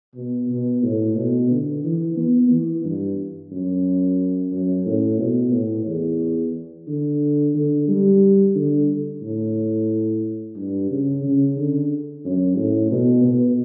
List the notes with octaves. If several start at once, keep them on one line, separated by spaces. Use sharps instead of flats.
B2
B2
A2
B2
D3
E3
B3
E3
G2
F#2
F#2
A2
B2
A2
E2
D3
D3
G3
D3
A2
G2
C#3
C#3
D3
F#2
A2
B2
B2